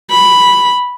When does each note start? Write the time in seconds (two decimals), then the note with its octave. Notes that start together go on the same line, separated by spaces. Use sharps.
0.11 B5